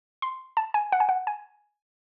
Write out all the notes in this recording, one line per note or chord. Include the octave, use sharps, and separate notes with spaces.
C6
A5
G#5
F#5
G#5
F#5
G#5